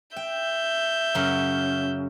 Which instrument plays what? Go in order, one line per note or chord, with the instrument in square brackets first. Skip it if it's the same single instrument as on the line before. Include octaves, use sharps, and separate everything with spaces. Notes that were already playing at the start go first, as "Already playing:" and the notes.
[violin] E5 G6 [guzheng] G5
[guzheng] F#2 C#3